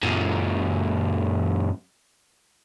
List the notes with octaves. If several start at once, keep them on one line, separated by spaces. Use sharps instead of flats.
F#2 A#2